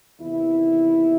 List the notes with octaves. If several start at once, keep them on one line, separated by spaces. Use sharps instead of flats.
E2 C3 D#3 E4